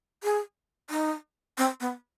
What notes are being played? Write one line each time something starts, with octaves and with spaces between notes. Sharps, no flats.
G#4
D#4
C4
B3